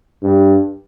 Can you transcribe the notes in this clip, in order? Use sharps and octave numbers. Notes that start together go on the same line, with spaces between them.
G2